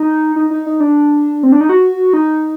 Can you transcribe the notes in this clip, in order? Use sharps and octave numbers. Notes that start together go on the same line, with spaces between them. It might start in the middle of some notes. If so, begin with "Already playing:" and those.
Already playing: D#4
D#4
D#4
D#4
D4
C4
D4
D#4
F#4
D#4